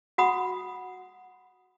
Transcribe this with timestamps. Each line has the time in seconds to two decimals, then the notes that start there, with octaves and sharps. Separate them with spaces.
0.18 F#4 F#5 B5 D#6